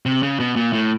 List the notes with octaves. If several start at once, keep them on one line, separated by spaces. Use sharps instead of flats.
C3
C#3
B2
A#2
A2